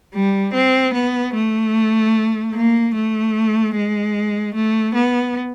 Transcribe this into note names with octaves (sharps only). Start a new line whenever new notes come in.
G3
C4
B3
A3
A#3
A3
G#3
A3
B3